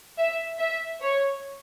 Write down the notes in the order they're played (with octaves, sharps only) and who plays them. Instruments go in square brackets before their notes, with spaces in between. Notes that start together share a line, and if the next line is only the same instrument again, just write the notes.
[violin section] E5
E5
C#5